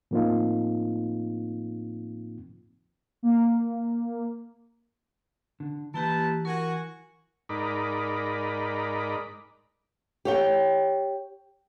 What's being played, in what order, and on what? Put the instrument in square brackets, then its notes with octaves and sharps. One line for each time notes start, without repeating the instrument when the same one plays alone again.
[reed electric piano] A2 F3 A#3 C4 D#4 F4
[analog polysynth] A#3
[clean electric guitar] D3
[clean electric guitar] E3 [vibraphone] A#3 E4 G4 [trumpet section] B4 A5
[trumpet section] F#4 G#5 C#6 [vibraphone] A#4
[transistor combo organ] G#2 D#4 A#4 D5 B5
[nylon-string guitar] G4 C#5 G5